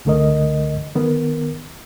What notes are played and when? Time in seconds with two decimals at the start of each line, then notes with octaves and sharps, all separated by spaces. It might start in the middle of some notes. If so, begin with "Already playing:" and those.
0.05 C#2 D3 A3 A#4 D#5
0.95 D#3 B3 A#4